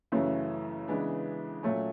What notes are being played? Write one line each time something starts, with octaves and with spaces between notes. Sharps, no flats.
F#2 C#3 E3 A3 C#4
C#3 E3 G#3 B3 D4
A#2 F#3 A3 C#4